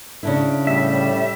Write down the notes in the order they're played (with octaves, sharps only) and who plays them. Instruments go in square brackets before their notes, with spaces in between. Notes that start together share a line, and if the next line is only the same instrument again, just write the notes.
[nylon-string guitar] C#3 D4 E4
[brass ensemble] A2 G3 [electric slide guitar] E5